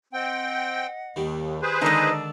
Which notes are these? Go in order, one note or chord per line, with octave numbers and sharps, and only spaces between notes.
C4 D#5 F#5 G5
D#2 D#3 G3
G#4 B4 C5
D3 D#3 G#3 D4 D#4 D#5 A5 E6